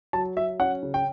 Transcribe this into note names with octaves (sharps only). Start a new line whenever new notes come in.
F#3 A5
F#3 E5
C#4 F#5
C#3
G5